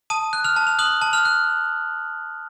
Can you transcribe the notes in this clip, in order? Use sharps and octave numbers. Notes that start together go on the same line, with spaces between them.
A5 D#6 D#7
F#6
F6 F7
A5
F7
D#6 F#6 F#7
A5
F6 F7
F#6